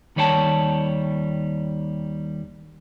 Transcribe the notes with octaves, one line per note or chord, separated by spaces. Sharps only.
D#2 D#3 G3 C#5 G5 A5